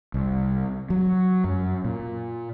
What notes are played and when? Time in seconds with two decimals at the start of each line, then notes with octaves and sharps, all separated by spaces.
0.14 C2
0.90 F#3
1.44 F#2
1.85 A#2